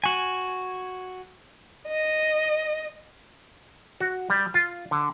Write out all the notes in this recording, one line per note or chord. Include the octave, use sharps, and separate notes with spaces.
F#4 G#5
D#5
F#4
G3
F4
D3